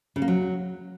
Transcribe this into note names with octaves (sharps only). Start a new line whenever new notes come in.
C#3
A#3
F#3